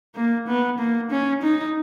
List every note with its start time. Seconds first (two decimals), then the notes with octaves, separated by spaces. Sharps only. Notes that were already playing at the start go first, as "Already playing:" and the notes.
0.15 A#3
0.47 B3
0.78 A#3
1.10 C#4
1.42 D#4